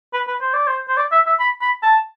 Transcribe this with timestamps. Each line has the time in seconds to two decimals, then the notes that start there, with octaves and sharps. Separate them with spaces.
0.13 B4
0.27 B4
0.41 C5
0.53 D5
0.67 C5
0.89 C5
0.97 D5
1.12 E5
1.26 E5
1.40 B5
1.61 B5
1.83 A5